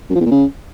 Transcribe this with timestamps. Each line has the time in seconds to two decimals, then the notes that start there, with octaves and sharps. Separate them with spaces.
0.10 F#2
0.15 F3
0.20 E2
0.26 A#2
0.31 C#3